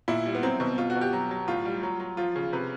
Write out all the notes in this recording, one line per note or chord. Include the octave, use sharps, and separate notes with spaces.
A#2 E4
G3
B3
F#3 C4
B2
B2 F4
F#4
B2
G4
F#3
F#3
A2 F4
G3
F#3
F#3
F3 F4
C#3
C3 B4